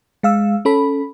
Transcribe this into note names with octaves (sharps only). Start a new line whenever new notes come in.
G#3 F5 E6
C#4 A4 B5